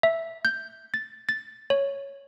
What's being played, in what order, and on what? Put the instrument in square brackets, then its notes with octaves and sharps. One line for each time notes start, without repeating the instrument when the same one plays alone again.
[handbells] E5
G6
A6
A6
C#5